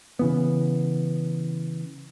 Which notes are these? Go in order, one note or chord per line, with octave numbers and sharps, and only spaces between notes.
C#3 E3 B3